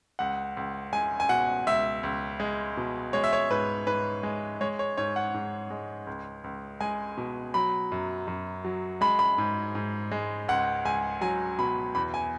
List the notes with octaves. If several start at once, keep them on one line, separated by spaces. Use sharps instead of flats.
C#2 F#5
C#2
G#3 G#5
G#5
B2 F#5
C#2 E5
C#2
G#3
B2
G#3 C#5
E5
C#5
G#2 B4
G#2 B4
G#3
G#3 C#5
C#5
G#2 C#5
F#5
G#2
G#3
C#2
C#2
G#3 G#5
B2
F#3 B5
F#2
F#2
F#3
G#3 B5
B5
G#2
G#2
G#3
C#2 F#5
C#2 G#5
F#3 G#5
B2 B5
E2 B5
G#5